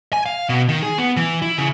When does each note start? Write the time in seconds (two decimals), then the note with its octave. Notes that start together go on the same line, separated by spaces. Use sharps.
0.13 G#5
0.26 F5
0.49 B2
0.69 D#3
0.83 G#4
0.98 B3
1.17 E3
1.42 E4
1.58 C#3